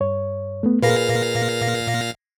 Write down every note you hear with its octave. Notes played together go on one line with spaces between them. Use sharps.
G2 C#5
A3 B3
A#2 G#4 A#4 B4 F5 A#6